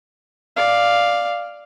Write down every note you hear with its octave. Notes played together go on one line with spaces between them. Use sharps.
D5 F5